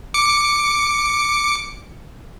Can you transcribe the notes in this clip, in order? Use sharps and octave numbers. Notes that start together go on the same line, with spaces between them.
D6 C#7